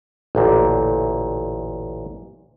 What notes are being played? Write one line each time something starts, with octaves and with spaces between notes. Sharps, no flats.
A1 D2 A#2